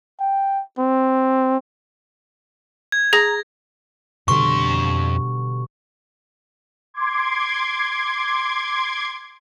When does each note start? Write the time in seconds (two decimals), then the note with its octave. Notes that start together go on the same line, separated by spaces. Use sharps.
0.20 G5
0.79 C4
2.92 G#6
3.13 G#4 A#5 A#6
4.28 F2 B2 D3 G3 C6 C#6
6.94 C6 D6 G#6